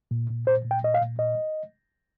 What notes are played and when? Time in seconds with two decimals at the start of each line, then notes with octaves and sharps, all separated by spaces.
0.11 A#2
0.30 A#2
0.47 A#2 C5
0.65 A#2
0.71 G5
0.84 A#2 D#5
0.94 F5
1.01 A#2
1.19 A#2 D#5